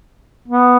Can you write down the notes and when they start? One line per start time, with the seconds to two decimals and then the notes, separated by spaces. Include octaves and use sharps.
0.48 B3